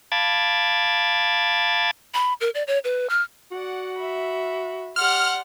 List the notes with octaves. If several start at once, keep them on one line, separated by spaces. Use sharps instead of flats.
F5 A5 B5 D6 G#6 A6
B5
A#4
D5
C#5
B4
F6
F#4 D5 F#5
E5 B5
G4 D5 F#5 C6 F6